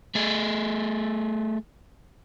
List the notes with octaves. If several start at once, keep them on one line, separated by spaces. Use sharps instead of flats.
A3 G#4